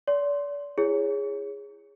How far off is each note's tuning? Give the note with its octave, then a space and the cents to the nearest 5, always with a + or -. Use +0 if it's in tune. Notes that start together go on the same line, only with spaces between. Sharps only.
D5 -35 C6 +0
E4 +25 G#4 -10 C#5 +0